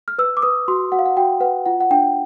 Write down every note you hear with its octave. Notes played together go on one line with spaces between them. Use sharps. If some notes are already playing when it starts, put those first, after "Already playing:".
F6
B4 E6
D6
B4 D#6
F#4 C6
F#4 F#5
F5
F#5
F#4 G5
B4 F#5
F4 F#5
F#5
D4 G5